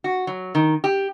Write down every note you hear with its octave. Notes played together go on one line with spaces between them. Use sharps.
F#4
F#3
D#3
G4